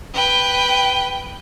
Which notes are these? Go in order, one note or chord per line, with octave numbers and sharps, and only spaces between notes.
B4 G5